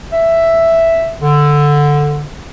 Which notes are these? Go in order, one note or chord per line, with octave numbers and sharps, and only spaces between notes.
E5
D3